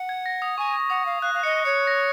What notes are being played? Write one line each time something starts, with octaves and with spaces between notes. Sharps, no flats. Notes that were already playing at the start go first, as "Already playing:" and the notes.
Already playing: F#5
G#6
A#6
D#6
G#5 C#6
C#6
F#5 D#6
F5
F5 F#6
F5
D#5 C#7
C#5 C#7
A#6